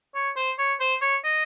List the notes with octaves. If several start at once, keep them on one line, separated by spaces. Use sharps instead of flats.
C#5
C5
C#5
C5
C#5
D#5